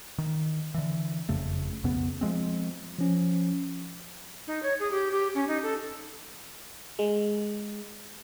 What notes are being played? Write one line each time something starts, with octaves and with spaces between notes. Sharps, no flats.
D#3
D3 E3
F#1 F2 C#3 A3
B1 F2 C#3 B3
F3 G#3 C4
F3 C#4
D#4
C#5
G#4
G4
G4
C#4
D#4
A4
G#3